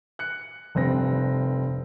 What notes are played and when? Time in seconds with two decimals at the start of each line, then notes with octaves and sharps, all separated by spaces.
0.19 F#6 C#7
0.75 F1 G2 C4 A#6